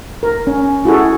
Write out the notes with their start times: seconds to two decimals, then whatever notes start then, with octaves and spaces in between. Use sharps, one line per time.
0.23 A#4
0.47 C#4
0.85 E4 F#4 G#4 A4